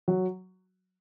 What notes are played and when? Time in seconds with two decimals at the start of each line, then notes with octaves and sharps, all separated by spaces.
0.08 F#3